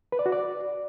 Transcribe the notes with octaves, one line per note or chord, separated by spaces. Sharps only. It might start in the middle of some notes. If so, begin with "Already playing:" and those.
B4
D5
F#4
D5